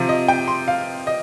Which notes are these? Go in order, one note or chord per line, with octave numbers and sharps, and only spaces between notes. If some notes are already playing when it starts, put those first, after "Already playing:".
Already playing: C3 F3
D#5
G5
C6
F5
D#5